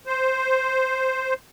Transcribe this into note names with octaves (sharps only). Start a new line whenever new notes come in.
C5